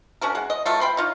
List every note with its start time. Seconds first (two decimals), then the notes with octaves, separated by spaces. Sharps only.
0.21 C#4 D4 F#4 A#4
0.35 G#3 F#5
0.50 D#5
0.65 E3 F#3 A3 F4
0.81 G5 B5 C6
0.97 D#4 F4 C#5